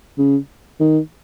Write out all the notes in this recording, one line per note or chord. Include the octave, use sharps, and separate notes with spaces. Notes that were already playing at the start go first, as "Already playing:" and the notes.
C#3
D#3